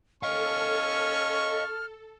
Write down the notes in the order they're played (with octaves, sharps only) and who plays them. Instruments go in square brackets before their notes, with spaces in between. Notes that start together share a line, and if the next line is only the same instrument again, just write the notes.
[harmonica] C#4 C#6 [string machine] A4 [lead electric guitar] D#5 F5 [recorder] F6